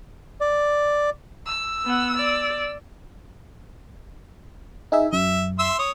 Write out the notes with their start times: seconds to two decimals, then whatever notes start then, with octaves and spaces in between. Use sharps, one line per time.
0.41 D5
1.46 E6
1.85 B3 F#5
2.17 D5
4.92 D#4 G#4 E5
5.13 F#2 E5
5.59 E5 C6 E6
5.79 C#5 D#6